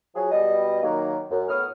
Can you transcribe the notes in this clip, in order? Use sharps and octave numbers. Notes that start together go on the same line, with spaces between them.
F3 F#3 G#4
B2 G3 D#5
D#3 F#3 A#3
F#2
A2 B3 C#5 D#6 F6